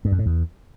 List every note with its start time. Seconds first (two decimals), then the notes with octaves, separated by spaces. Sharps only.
0.05 G2
0.12 F#2
0.19 A2
0.26 E2